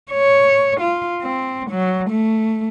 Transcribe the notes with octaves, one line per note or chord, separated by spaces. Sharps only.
C#5
F4
C4
F#3
A3